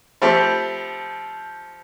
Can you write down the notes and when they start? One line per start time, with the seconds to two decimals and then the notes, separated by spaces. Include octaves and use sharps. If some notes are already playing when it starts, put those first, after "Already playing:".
0.22 F3 A3 C4 G4 B5